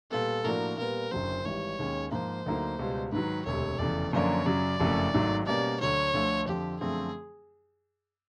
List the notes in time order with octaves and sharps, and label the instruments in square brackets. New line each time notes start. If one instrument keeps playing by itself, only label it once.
[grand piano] A#2 G3 B3 [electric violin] A4
[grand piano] A2 F3 A#3 D4 F#4 [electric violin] A#4
[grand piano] A#2 G3 B3 [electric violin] A#4
[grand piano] F#1 F#2 D3 F#3 [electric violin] C5
[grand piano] G#1 G#2 E3 G3 [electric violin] C#5
[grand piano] D#2 D#3 G#3 C#4
[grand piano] G#2 F3 A#3 [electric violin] C5
[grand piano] D2 D3 F#3 A#3 D#4
C#2 B2 G3
[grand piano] G#2 D#3 F#3 [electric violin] B4
[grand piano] E1 D2 C3 [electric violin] C#5
[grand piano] F1 E2 C#3 [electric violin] D5
[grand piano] F#2 D3 F3 A#3 D4 [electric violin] C#5
[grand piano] F#2 C#3 F#3 [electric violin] D5
[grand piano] F#1 F2 C#3 F#3 A3
G#1 G#2 D#3 F#3 A3
[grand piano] B2 G3 A#3 C#4 [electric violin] D5
[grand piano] D2 D3 F#3 [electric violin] C#5
[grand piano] D2 D3 F3 A3
[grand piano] F2 D3 F3 [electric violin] G4
[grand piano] F#2 D3 F3 A3 C4 [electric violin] G#4